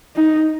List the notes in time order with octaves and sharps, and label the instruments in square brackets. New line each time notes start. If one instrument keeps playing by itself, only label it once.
[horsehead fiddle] D#4